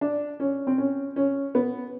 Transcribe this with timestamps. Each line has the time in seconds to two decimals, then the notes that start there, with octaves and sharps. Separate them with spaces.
0.01 D4
0.40 C#4
0.67 C4
0.78 C#4
1.16 C#4
1.55 B3